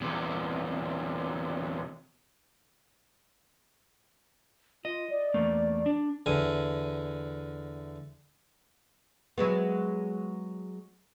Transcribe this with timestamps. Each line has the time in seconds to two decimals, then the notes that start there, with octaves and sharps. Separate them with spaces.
0.01 E2 C3
4.85 F4 D#5
5.10 D5
5.34 E2 A3 A#3
5.86 D4
6.26 E2 D3 G#5
9.38 F#3 G#3 B3